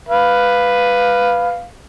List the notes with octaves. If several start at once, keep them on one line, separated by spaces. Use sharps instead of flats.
B4 F5